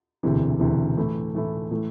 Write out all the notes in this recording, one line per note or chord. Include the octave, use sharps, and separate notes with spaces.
E1 D2 C3 E3
E1 D2 C3 E3
A2 E3 A3 E4
A2 E3 A3 E4
A2 E3 A3